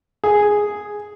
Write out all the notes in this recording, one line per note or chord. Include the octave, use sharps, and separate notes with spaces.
G#4